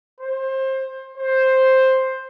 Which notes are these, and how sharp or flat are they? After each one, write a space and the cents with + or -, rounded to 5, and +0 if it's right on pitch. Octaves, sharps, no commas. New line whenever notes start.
C5 +25
C5 +5